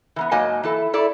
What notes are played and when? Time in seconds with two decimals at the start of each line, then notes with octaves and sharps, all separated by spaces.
0.16 E3 A#3 B3
0.31 G#2 F#3 A#3 D#5 G#5 A5
0.63 E3 E4 A4
0.94 E4 A4 D5